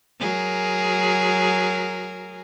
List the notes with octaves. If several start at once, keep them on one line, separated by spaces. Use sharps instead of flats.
F#3 G#4 A#4